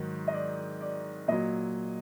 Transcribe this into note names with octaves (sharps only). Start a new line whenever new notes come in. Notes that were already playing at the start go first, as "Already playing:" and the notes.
Already playing: G#2 D#3 F#3
D#5
D5
D5
A#2 F#3 D#5